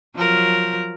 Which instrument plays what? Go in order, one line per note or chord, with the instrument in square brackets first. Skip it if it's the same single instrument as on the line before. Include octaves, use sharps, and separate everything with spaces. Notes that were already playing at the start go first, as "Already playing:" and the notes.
[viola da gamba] F3 F#3 A#4